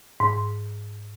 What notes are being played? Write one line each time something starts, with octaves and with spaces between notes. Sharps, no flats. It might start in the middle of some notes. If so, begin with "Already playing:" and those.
G#2